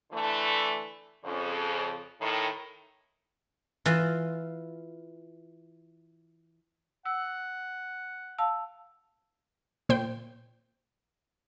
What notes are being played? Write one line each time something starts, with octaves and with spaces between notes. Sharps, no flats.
D3 E3 A3
F2 C#3
A2 D#3
E3 F4
F#5 E6
F5 A5 E6
A#2 C5 G5